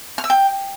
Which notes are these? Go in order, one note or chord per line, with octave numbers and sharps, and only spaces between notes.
F6
E6
G5